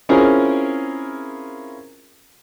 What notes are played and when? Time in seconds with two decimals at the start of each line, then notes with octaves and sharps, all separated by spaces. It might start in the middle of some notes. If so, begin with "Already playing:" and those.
0.09 C4 C#4 E4 F4 G#4 A#4